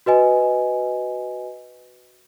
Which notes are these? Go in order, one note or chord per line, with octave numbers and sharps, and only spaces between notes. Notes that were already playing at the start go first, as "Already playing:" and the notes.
F#4 B4 D#5 G#5